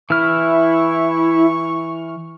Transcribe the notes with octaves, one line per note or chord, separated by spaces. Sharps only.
E3 E4 C#6 F6